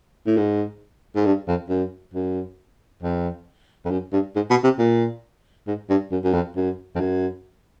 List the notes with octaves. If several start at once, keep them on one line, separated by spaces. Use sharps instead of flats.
A2
G#2
G#2
G2
F2
F#2
F#2
F2
F2
F#2
G2
G#2
B2
C3
A#2
G#2
G2
F#2
F#2
F2
F#2
F2
F#2